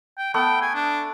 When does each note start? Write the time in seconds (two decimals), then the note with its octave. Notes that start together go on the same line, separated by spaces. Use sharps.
0.18 G5
0.34 A3 B3 G5
0.62 G#5
0.75 D4